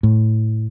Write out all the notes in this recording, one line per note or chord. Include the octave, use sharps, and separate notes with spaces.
A2